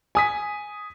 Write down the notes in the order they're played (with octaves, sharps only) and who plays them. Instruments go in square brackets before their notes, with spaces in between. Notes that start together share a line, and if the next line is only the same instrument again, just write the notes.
[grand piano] G#5 D#6 B6